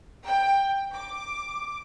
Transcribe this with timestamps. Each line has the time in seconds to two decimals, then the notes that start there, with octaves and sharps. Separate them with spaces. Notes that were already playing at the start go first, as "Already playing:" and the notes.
0.24 G5
0.92 D6